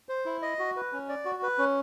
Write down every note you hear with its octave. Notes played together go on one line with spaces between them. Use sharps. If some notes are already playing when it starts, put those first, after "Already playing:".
C5
E4
D#5
F#4
B4
C#4
D5
F#4
B4
C#4